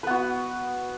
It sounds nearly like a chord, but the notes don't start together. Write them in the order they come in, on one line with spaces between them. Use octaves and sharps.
B4 B3 F#4